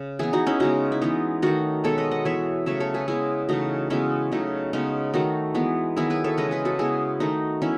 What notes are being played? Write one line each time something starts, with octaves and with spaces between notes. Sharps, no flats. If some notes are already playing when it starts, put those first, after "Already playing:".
Already playing: C#3
E3 B3 E4 G#4
D#4 F#4
C#4 E4
C#3 G#3 B3 D#4 F#4
E4
E3 G#3 B3 D#4
D#3 A3 D#4 F#4
B2 G#3 B3 A4 C#5
B4 D#5
D#5 F#5
E3 B3 C#5 E5
C#3 F#3 A3 C#5 E5
A4 C#5
G#4 B4
C#3 G#3 B3 E4 G#4
C#3 E3 A3 D#4 F#4
C#3 G#3 B3 C#4 E4
C#3 F#3 A3 D#4
C#3 G#3 B3 D#4
D#3 A3 D#4 F#4
E3 G#3 B3
D#3 F#3 B3 E4 G#4
G#4 B4
A4 C#5
C#3 E3 G#3 B4 D#5
G#4 B4
F#4 A4
C#3 G#3 B3 E4 G#4
D#3 A3 D#4 F#4
E3 B3 C#4 E4